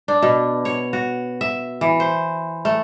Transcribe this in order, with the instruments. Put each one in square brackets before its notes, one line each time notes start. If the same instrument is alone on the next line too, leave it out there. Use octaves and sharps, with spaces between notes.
[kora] D4
B2
C#5
F#4
E5
E3
C5
A3